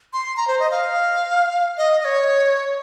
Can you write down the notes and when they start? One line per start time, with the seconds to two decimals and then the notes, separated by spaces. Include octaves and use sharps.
0.13 C6
0.37 A#5
0.48 C5
0.60 D#5
0.71 F5
1.78 D#5
2.01 D#5
2.05 C#5